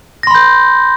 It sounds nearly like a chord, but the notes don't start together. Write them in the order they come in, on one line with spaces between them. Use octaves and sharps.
A#6 C6 B5 G6